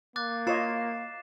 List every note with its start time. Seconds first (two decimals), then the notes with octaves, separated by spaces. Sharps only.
0.16 A#3 D6 F#6 A6
0.47 F4 C#5 D#5 A6 C7 E7